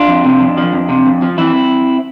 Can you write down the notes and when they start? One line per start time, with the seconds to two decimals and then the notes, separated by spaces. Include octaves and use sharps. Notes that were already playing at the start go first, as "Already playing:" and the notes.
Already playing: D4 F4
0.08 F2
0.25 C3
0.41 F2
0.57 F3
0.73 F2
0.89 C3
1.06 F2
1.22 F3
1.38 E3 C4 E4